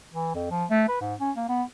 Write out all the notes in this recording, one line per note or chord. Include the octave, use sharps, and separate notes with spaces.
E3
F2
F3
A3
B4
G#2
C#4
A#3
B3